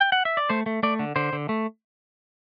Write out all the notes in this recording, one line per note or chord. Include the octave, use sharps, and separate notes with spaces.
G5
F#5
E5
D5
A3 C5
A3
A3 D5
D3
D3 C5
D3
A3